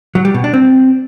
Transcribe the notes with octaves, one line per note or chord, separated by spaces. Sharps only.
F#3
G3
B2
D4
C4